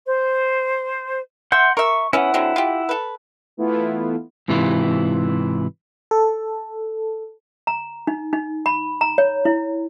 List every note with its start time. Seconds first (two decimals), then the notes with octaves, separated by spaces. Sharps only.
0.06 C5
1.52 E5 F#5 C6 G6
1.77 A#4 E5 C#6
2.13 B3 C#4 E4 F#5
2.34 D3 F#3 C4
2.56 F4 G4
2.89 A4 B4
3.57 E3 A3 B3 E4 F4
4.48 G#2 C3 E3 E4 F4
6.11 A4
7.67 A#5
8.07 D#4
8.33 D#4
8.66 B5
9.01 A#5
9.18 C#5
9.45 E4